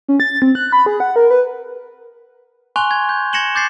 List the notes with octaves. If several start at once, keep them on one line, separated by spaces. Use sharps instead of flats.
C#4
A6
C4
F#6
B5
G#4
F#5
A#4
B4
G#5 C6 C#6 F#6 F7 G7
G#6
G6
G#6 A#6 C#7 E7 F#7 G7
D6 G6 A6 C7